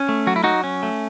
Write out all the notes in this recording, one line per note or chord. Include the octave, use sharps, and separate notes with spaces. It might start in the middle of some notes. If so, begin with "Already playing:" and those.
Already playing: C#4
A3
F#3 F#4
E4
F#3 D#4 F#4
C#4
A3